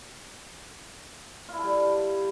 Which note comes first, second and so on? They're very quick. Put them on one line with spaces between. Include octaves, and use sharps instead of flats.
F4 E4 A4 G3